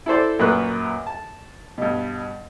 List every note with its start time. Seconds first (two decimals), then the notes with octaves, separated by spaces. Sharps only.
0.06 E4 A4 C5 D5
0.39 F#2 A#2 A#3 B4 C#6 F#6
1.07 A5
1.78 G2 B2